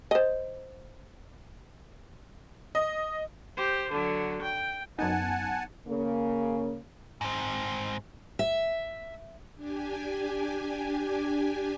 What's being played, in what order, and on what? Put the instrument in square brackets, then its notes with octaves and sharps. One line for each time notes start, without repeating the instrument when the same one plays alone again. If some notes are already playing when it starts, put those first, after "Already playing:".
[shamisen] C5 D#5
[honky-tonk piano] D#5
[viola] G4 C5
D3 F#3
G5
[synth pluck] F#2 B3 D#4 [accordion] F#5 G#5 A5
[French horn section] C#3 A#3
[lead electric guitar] G#2 C4
[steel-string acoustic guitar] E5
[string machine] D4 G4 G#5